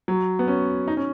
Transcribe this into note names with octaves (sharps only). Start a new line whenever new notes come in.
F#3
B3
C#4
D#4
C#4